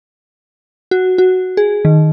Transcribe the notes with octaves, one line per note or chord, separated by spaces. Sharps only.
F#4
F#4
G#4
D#3